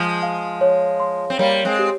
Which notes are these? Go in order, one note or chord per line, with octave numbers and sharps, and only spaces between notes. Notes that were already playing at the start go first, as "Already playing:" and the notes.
Already playing: F3 G#3 G#5
F5
C#5
C6
C4
G3 A#3 C#5
G#3 C4
G4